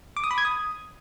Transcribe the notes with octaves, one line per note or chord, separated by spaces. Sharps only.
D6
D#6
B5
G#6
D#6